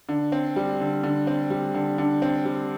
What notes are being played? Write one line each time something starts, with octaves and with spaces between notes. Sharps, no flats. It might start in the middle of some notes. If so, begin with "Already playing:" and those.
D3
C4
G3
D3
D3
C4
G3
D3
D3
C4
G3